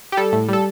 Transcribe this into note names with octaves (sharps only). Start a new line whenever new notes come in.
G4
G3 A4
A2
G3 A4